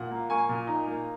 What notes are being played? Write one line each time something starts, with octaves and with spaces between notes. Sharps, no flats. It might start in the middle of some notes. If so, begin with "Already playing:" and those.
Already playing: A#2 F#5
A#3
A#3 G#5 C#6
A#2
D#4
A#3